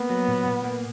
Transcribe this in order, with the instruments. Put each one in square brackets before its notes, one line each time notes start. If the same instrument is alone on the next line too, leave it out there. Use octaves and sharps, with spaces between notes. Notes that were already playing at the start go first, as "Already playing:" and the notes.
Already playing: [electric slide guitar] A#3 [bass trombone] B3
[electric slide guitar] F#3
A#2
A#2
A#3